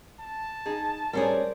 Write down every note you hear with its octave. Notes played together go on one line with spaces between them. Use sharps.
A5
D#4 G#4
G3 C#4 G#4 A#4 C5 D5